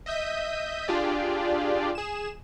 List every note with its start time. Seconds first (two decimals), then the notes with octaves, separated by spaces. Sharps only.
0.06 D#5 E5 G6 B6 D#7
0.88 D4 F4 G4 G#4 D5
1.95 G#4 E7